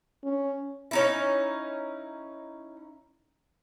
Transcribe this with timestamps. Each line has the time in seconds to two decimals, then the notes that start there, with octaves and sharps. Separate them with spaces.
0.24 C#4
0.91 C#4 D#4 E4